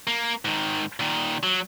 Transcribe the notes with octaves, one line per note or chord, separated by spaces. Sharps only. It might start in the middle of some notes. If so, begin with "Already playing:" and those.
A#3
G#2 D#3
A#2 D#3
F#3